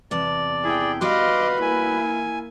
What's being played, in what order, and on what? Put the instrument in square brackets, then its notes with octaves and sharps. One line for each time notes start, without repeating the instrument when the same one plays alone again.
[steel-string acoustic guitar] E2 C3 A5 [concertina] D5
[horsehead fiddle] E4 G5 [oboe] G#4
[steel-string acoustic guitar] G3 B3 F#4 [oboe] B4 [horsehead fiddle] D#5 F5 [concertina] C6 D6
[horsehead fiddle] A#3 E4 [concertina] G#5